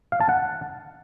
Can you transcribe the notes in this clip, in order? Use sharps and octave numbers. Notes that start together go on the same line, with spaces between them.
F5
A5
F#5